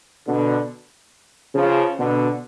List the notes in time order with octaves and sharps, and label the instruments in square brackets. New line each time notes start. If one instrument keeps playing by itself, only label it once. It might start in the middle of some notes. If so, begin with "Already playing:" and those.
[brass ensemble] B2 D3
C#3 F3
B2 D3